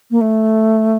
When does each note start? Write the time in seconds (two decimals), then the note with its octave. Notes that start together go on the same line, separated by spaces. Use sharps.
0.11 A#3
0.21 A3